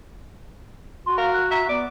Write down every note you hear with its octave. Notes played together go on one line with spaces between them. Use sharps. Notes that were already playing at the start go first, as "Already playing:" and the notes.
F#4 C6
A#4 F5
F#6
E5 A#5
B3 D5 D6